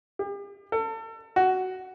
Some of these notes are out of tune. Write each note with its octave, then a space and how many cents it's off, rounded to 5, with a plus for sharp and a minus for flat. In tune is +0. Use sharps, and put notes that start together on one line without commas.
G4 +40
A4 +35
F#4 +10